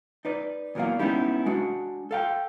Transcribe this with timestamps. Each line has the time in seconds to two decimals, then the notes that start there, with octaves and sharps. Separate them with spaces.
0.25 D#4 B4 D5
0.75 E2 E3 F#3 A#3 D5 F5
0.99 G#3 B3 C#4 D#4 E4 G4
1.46 G#3 D4 F#4
2.11 A4 F5 G5